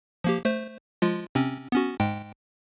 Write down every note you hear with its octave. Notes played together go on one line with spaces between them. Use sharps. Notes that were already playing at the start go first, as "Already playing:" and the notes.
F3 A#3 G4
A3 C5
F3 G#3 F4
C3 C4 C#4
B3 C#4 F#4
G#2 G#3 G5